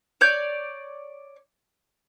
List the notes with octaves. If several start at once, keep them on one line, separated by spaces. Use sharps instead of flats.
C#5 D5 G6